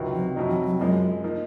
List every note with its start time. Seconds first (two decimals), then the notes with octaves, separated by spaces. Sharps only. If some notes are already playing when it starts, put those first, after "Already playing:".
Already playing: C#2 C3 D#3 F#3 C4
0.15 F3
0.36 F2 C3 F#3 C4 D#4
0.50 F3
0.65 F#3
0.79 F#2 F3 F#3 G#3
1.24 F3 A#3 D#4